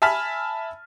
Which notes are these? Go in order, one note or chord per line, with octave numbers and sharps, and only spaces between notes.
E5 G#5 A5 B5 F6 B6